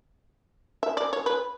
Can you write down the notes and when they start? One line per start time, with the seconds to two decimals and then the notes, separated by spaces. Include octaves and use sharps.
0.83 E5
0.97 D5
1.13 C#5
1.26 B4